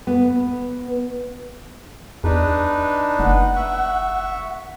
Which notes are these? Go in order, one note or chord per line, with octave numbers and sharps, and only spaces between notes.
B3
E2 D4 D#4 B4
F#1 F#5
E5 C#6